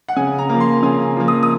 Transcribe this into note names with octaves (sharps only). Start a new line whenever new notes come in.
F#5
C#3 G#5
A#5
F3 A#3
C6
C#3 G#5
F3 A#3
D#6
D#6